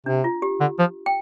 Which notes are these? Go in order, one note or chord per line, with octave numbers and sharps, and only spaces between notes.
C3 D4
F4
G4
D3
F3
G5